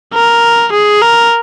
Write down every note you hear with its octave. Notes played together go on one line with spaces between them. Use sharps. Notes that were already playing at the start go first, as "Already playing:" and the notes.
A#4
G#4
A#4